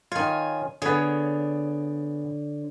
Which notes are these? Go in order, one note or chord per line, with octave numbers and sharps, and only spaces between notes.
D#3 F4 C#5 G#5
D3 B3 G#4 C#5